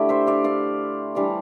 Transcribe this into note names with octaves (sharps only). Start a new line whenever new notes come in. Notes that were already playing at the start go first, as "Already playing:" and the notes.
Already playing: D3 A3 E4 G4 D5
C5 E5
D5 F5
D5 F5
E3 G3 D4 D5 F5